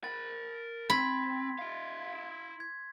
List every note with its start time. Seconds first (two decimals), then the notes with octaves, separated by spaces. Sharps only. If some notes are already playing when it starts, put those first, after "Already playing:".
0.04 A#4 B5 A6
0.90 C4 B5 C6 G#6 B6
1.59 E4 F5
2.60 G#6